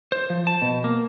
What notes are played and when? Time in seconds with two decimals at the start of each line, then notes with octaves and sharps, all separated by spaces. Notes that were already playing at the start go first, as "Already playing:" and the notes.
0.12 C5
0.30 F3
0.47 A5
0.62 B2
0.84 A#3